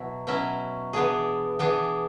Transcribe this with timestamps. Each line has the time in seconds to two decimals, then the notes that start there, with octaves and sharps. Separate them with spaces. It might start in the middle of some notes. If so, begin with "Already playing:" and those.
Already playing: B2 F#3 E4
0.27 B2 F#3 C#4 E4
0.93 E3 B3 D4 G#4
1.59 E3 B3 D4 G#4